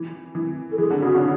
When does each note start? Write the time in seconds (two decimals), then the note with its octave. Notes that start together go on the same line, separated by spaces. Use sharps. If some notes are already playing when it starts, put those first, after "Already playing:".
Already playing: E3
0.35 E3
0.72 A4
0.78 E3 G#4
0.90 D3
1.01 C#3 F#4
1.15 D3